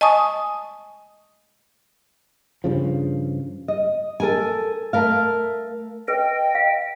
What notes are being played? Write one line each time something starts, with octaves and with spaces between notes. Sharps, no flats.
D#5 G#5 A5 C#6 D#6
G2 C#3 F3
D#5
A4 A#4 G#5
A3 A#4 F5
B4 D#5 G5
F5